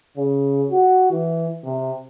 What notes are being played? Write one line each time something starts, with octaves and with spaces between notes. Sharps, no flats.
C#3
F#4
E3
C3